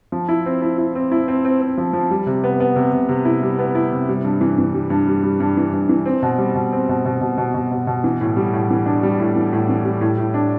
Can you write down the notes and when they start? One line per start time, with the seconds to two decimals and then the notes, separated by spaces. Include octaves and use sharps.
0.12 F3
0.29 E4
0.46 C4
0.62 E4
0.78 E4
0.95 C4
1.12 E4
1.28 C4
1.45 C4
1.61 C4
1.78 F3
1.93 F3
2.11 G3
2.26 C3
2.44 B3
2.60 B3
2.76 C3
2.93 C3
3.09 C3
3.25 E4
3.42 G3
3.58 B3
3.75 E4
3.92 C3
4.09 G3
4.24 G2
4.41 E3
4.58 E3
4.74 G3
4.90 G2
5.08 G3
5.23 G3
5.40 G2
5.57 E3
5.73 G2
5.89 E3
6.06 C4
6.23 B2
6.38 G3
6.55 B2
6.73 C4
6.89 B2
7.05 B2
7.21 B2
7.38 B2
7.54 B2
7.71 B2
7.87 B2
8.04 E3
8.21 A2
8.36 G3
8.54 A2
8.70 E3
8.86 D4
9.03 G3
9.20 A2
9.36 E3
9.53 A2
9.69 E3
9.85 G3
10.01 A2
10.18 A2
10.34 D4